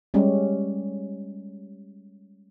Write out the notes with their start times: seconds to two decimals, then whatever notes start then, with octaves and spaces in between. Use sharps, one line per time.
0.14 G3 G#3 C#4 G4